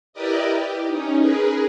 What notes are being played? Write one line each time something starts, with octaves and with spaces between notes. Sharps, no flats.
E4 G4 A#4 B4 D5 D#5
G4
C#4 D#4
G#4 A#4 B4